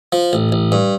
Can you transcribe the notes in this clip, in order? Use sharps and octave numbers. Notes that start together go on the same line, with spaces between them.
F3
A1
A1
G2